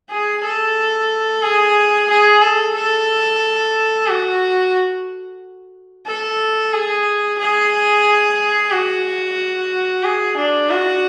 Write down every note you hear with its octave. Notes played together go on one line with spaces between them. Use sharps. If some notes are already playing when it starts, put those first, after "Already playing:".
G#4
A4
G#4
G#4
A4
A4
F#4
A4
G#4
G#4
F#4
G#4
D4
F#4